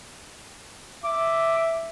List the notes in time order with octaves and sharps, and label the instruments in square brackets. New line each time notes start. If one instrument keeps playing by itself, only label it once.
[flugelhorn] E5 [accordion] D6